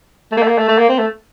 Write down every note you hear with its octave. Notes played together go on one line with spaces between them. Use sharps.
A3
A#3
A3
A#3
A3
A3
A#3
C4
A3